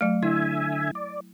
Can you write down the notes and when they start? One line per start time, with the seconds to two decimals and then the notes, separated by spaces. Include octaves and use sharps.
0.01 F#3 A3
0.23 D3 E4 E5 G#5
0.95 D5